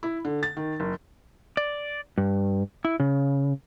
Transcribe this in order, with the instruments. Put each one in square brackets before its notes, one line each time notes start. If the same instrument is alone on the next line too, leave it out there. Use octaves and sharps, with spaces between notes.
[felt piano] E4
D3
A6
D#3
F#1
[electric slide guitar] D5
G2
E4
C#3